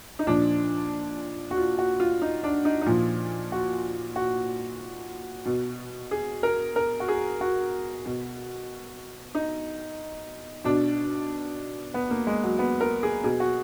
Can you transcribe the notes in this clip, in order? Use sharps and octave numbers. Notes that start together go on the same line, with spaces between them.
D#4
A#2 F3 D4
F#4
F4
F#4
F4
D#4
D4
D#4
D#4
A#2 F3 F4
F#4
F#4
B2
G#4
A#4
A#4
F#4
G#4
F#4
B2
D#4
B2 D4
B3
A#3
G#3
F#3
B3
A#4
G#4
B2 G#4
F#4